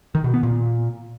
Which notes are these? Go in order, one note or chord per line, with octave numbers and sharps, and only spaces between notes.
D#3
B2
B3
A#2